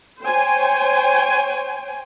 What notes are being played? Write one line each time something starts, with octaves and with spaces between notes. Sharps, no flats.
C5 C#5 G5 G#5